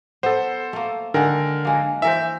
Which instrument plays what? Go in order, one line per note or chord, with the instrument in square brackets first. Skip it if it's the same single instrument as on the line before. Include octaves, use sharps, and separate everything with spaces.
[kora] B3 [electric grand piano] A4 C5
[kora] A3 A#3
[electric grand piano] D3 A#4 [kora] D#3 G#3 F#5
[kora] G#3 A#3
[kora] E3 A#4 C5 [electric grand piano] E5